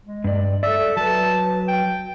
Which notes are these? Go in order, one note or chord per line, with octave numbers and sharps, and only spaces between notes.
G#3
G2 D5
A4 D5 E5
F#3 B4 A5
G5